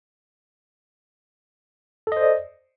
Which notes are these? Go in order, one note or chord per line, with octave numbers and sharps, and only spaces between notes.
A4 C5 D5 D#5